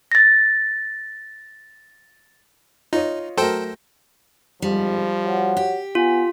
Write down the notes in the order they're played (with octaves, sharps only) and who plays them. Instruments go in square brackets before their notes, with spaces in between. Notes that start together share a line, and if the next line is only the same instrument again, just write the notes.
[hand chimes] A6 A#6
[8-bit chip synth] D#4 [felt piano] F4 C#5 D#5
[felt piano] F#3 A3 A#4 [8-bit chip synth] A4 C5 G5
[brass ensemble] G1 F2 G#2 [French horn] F3 [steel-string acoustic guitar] G3
[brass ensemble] F#4 C#5 F#5
[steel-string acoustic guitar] G4
[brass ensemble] B3 F#5 G#5 [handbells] F4